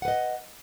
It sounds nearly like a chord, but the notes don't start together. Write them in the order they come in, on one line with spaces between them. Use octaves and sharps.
F#5 B4 D#5